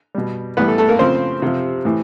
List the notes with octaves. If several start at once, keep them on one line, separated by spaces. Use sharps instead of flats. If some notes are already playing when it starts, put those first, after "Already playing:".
B2 G3
A2 E3 G3 B3 B4
A3 A4
A3 A4
A#3 A#4
C#3 F3 C4 C5
C3 F3
A2 E3